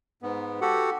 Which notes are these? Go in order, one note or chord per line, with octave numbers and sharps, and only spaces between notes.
G#2 B3
F#4 G4 A4 F#5